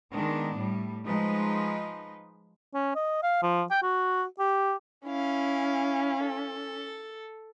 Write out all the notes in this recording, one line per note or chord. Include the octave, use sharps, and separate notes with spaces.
D#3 G#3 B3 D4
A2 G3
F3 G#3 D#4 B4
C#4
D#5
F5
F3
G5
F#4
G4
C#4 E4 F5
A4